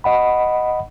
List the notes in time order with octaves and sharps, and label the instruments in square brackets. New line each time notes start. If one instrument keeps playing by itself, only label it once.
[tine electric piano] D#5 F#5 B5